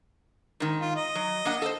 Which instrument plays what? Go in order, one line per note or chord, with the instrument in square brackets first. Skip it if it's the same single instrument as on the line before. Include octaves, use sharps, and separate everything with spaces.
[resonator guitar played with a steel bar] G#2 D#3
[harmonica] F4
D#5
[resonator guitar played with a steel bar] F#3
A#3 D4 F#5
A4 C5